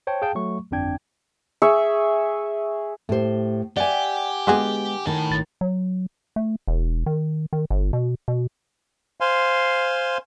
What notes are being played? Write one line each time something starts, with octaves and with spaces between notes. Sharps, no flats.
C5 C#5 G5 A5
G#4 F5 G5 A5
F#3 A3 C#6
G1 F2 C4 D4 G5 G#6
G#4 E5 C#6
A2 A3 G4 C5
G4 D5 E5 F#5 G#5
D3 G#3 B3 F#4 G#4
A2 D#3 A5
G#1 A6
F#3
A3
E1
D#3
D#3
G1
B2
B2
C5 F5 G#5 C6